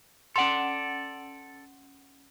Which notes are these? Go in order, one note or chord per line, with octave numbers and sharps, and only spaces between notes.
C#4 A4 D5 F#5 C6